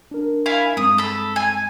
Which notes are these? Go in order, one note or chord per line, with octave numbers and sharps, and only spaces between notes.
D4 A#4
E4 F5 G#5
G2 G#3 C4 D#6
A4 B5
G#5